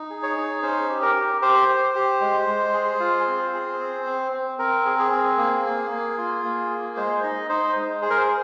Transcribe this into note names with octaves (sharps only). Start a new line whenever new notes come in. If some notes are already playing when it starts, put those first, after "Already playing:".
Already playing: D#4
G#4
C#5
D#4
C#4 C5
G4
A#4
G4
G4 C5
G4
G4
G#3
G#3
G#4
F4
C4
G#4
C4
C4
C4
C4 A#4
G#4
G#4
C4
A#3
A#3
A#3
F4
A#3
G#4
G#3 C5
D#4 D#5
D#4 C5
G#3
G#4 C5
A#4
C5